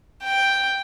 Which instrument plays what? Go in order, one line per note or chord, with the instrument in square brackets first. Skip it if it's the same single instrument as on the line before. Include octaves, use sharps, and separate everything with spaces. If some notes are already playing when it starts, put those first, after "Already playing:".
[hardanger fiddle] G5